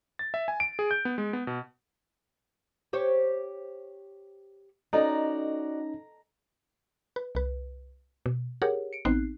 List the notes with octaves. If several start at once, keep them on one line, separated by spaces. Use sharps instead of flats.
A6
E5
G#5
D7
G#4
G6
B3
G#3
B3
B2
G4 C5 C#5
C#4 D#4 F#4 A4 D5 D#5 A#5
B4
C2 B4
B2
G4 G#4 A#4 C#5 F#5
C#7 D7
A1 B3 C4 D#4 F#6 C7